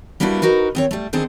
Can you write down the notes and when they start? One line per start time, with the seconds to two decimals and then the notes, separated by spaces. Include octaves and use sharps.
0.20 G3 A#3 B3 D4 E4 F#4
0.42 D#4 F#4 A#4 B4
0.75 D#2 C4 C#5
0.91 G3 A3
1.13 D3 D#3 C4 G#4 A4 C5